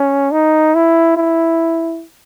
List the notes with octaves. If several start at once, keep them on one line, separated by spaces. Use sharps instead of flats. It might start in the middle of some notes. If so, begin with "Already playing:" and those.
Already playing: C#4
D#4
E4
E4